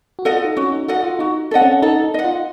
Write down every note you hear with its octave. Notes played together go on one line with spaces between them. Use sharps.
F#4
A4 D#5 F#5
F4
D#4
C#4 F#4
D#4
F#4 A4 D#5 F#5
F4
D#4 F#4
C4 A4 D#5 F#5
C#4
D#4 A4
D#4
D#5 F#5
F4